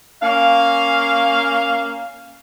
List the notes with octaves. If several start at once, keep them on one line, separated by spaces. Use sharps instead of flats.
A#3 C#4 F5